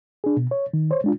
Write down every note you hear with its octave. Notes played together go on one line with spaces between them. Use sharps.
D4 G#4
B2
C#5
D#3
C5 C#5
G#3 D4 F4